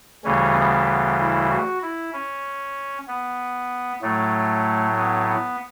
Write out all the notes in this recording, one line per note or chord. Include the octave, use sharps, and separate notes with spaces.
D2 C#3 E3 G3 C#4
B3
B3
E4
F#4
E4
C#4
B3
A2 F#3 A3
B3
B3